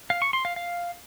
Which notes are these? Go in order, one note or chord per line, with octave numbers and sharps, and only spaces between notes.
F5
C#6
C6
F5
F5